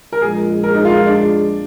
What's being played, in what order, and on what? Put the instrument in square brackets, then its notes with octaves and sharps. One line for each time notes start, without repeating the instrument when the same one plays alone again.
[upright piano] A#4
[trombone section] A#1 A#2 G#3 [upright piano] G#4
[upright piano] A#4
D#4
F4
D4